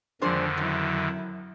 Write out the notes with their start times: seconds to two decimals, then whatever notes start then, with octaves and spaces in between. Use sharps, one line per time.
0.22 F2 D3 D#3 F3 G#3 D4 C5
0.57 F#2 F#3 E4